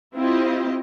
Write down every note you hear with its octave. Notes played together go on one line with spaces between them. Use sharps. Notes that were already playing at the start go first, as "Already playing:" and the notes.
C4 E4 F4 G4 D#5